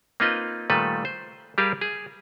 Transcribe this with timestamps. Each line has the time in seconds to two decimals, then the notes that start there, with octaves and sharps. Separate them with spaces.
0.20 A#3 C4 D#4 F4 B4 D#5
0.70 A#2 D#3 G3 A3 A4 B4
1.05 C5
1.58 G3 G4 G#4 A#4 F5
1.81 G#4